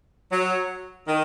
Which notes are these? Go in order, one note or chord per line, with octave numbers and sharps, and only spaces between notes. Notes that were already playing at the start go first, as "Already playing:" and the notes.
F#3
D#3